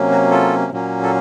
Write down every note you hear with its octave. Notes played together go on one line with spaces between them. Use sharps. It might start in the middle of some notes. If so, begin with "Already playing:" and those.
Already playing: C3 F#3 A#3 C#4
F#4
F4 A4
A#2 F#3 A#3 C#4
A4